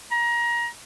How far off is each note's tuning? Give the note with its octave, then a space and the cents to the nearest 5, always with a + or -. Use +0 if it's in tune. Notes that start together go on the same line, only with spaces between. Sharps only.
A#5 +25